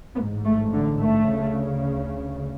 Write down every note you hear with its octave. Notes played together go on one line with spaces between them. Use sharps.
A1 G#2 B3
A3
D3
A3
D2 C#3